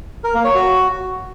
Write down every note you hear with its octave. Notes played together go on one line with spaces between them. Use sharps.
A#4
A#3
C#5
F#4